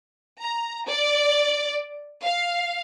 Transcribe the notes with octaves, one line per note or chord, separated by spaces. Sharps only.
A#5
D5
F5